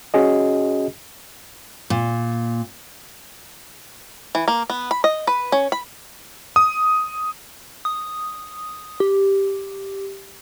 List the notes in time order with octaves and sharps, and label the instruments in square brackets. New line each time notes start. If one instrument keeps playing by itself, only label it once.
[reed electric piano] C#4 F#4 G#4 D#5
[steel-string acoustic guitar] A#2
[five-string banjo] E3
A#3
B3
B5
D#5
B4
C#4
B5
[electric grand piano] D#6
[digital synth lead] D#6
G4